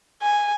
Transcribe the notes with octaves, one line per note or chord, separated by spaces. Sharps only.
G#5